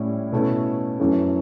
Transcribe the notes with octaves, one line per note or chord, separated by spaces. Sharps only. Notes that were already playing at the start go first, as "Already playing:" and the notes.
Already playing: A2 G3 C#4 E4
B2 A3 C#4 E4
F#2 E3 A3 C#4